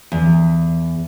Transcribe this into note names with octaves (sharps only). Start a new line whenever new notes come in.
E2